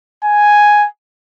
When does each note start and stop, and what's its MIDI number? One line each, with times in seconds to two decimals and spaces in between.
0.24 0.87 80